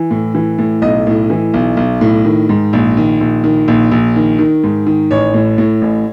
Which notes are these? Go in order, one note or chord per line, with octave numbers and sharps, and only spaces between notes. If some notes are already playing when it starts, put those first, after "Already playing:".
Already playing: E3
A2
E3
A2
B1 D#5
A2
E3
B1
B1
A2
D#3
G#2
A#1
D#3
A#1
D#3
A#1
A#1
D#3
D#3
G#2
D#3
A1 C#5
A2
A2
A1